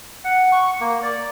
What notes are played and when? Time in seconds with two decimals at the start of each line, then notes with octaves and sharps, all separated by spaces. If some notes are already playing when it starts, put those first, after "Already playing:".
0.24 F#5
0.52 C#6
0.80 A#3
1.03 D5